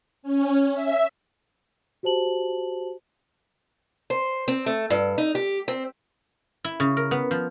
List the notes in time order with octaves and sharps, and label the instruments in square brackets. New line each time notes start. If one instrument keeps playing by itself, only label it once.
[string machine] C#4
E5
[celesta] F#4 G4 C5 A5 F#7
[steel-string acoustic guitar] C5
C4
A3
G2
D#4
G4
C4
[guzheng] E4
C#3
A#4
B3
F3